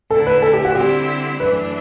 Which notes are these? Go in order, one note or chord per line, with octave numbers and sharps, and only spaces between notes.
D3 A3 E4 A4
B4
A4
G4
F#4
D3 G3 C4 E4 G4
F#2 E3 A3 D4 B4